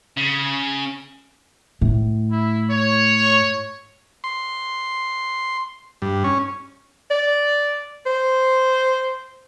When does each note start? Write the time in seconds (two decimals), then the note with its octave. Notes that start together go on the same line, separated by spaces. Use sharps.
0.17 C#3
1.81 A2
2.32 E4
2.71 C#5
4.24 C6
6.02 G2
6.24 C#4
7.11 D5
8.06 C5